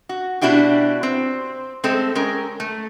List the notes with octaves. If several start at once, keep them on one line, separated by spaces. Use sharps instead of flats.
F#4
B2 D4 E4 F#4 G4
C4
G#3 A3 C4 A4
G#3 C#4 A#4
A3